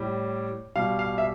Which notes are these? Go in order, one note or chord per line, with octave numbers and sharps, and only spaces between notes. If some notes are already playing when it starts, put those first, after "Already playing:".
Already playing: A2 G3
B2 G3 F5
F5
E5